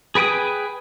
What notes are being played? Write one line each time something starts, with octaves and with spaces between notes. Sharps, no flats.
G#4 B4 G5 G#5 D#6